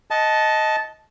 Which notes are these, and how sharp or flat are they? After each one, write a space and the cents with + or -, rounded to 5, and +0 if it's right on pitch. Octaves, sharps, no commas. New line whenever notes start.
D#5 +10 F#5 +0 A5 -10